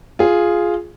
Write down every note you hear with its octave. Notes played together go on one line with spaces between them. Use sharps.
F4 G#4